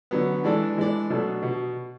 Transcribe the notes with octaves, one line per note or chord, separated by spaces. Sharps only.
D3 F#3 B3
E3 G#3 D4 A4 D5
E3 G#3 D4 A4 D5
B2 F#3 A3 D4 A4
B2